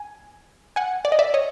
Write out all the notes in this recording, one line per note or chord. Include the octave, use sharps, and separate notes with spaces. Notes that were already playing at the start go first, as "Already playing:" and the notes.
Already playing: G#5
F#5 G#5
D5
D#5
D5 E5
C#5 D#5